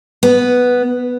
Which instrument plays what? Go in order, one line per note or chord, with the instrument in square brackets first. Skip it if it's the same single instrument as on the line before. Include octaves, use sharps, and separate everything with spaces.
[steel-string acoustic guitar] B3